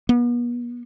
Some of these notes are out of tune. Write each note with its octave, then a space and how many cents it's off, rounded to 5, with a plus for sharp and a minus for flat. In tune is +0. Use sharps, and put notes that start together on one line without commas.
B3 -40